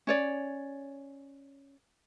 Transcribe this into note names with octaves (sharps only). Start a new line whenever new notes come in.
C#4 C#5 D5